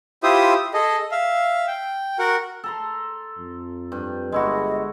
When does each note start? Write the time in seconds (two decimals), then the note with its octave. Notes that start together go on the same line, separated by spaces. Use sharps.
0.23 E4 F4 G4 C5 E5 D#6
0.73 G#4 A4 D#5
1.11 E5 F5
1.67 G5
2.19 F#4 A#4 F#5
2.64 A4 A#5 C6
3.38 F2
3.92 G2
4.32 G1 G#3 E4 F#4 D#5